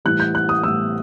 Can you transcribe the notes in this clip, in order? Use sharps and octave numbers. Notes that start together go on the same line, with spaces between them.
A2 E3 G3 F#6
G6
F#6
D#6
A2 E3 G3 E6